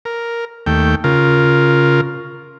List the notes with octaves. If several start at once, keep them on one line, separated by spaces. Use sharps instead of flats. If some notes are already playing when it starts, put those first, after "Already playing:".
A#4
D#2 A3 G5
C#3 F4 A#4